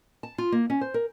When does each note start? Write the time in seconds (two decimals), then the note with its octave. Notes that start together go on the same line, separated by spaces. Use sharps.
0.23 A5
0.38 F4
0.52 A#3
0.70 C#4
0.81 C5
0.94 A#4